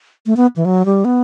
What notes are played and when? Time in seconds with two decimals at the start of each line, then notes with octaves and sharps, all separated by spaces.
0.26 A3
0.37 B3
0.56 E3
0.65 F#3
0.85 G3
1.05 B3